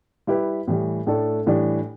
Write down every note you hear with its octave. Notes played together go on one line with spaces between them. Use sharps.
G3 E4 G4 B4
A2 E3 G3
A2 A3 D4 A4
A2 E3 G3 D4